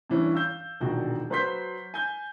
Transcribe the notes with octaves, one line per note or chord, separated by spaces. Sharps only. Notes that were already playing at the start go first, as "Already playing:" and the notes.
G2 E3 C#4
F5 E6 G6
E1 A#1 D#3 F#4
F#3 B4 C5 C6 G6 B6
G#5 G6